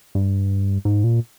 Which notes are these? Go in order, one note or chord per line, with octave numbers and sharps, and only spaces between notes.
G2
G#2
A#2